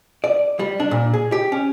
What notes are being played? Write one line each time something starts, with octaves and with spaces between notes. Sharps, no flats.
D5
G3
D4
A#2
G#4
G4
C#4